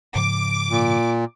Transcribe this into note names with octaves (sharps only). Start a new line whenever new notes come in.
G#2 C#3 F3 D6
A#2